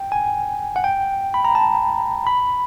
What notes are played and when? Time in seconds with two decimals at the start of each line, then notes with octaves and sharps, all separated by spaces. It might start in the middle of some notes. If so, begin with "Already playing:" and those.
Already playing: G5
0.12 G#5
0.76 F#5
0.84 G5
1.34 B5
1.45 A#5
1.55 A5
2.27 B5